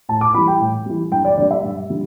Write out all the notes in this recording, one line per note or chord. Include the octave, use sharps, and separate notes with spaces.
A2 A5
D6
E3 G3 B5
G5
A2
E3 G3
G2 G5
D5
D3 G3 D5
E5
G2
D3 G3